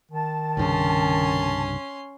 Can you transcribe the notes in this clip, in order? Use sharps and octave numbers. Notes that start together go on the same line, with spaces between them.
D#3 A5
C2 G2 C#3 C#4 C6